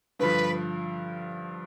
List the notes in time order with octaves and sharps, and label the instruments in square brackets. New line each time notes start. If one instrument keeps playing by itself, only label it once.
[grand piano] G2 D3 F3 [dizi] B4